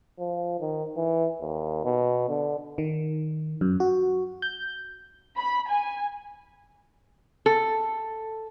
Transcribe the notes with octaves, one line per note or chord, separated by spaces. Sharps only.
F3
D#3
E3
D#2
B2
D3
D#3
F#2
F#4
G6
B5
G#5
A4